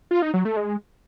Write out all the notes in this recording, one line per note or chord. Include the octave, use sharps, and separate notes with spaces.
F4
D#4
F#3
A3
G#3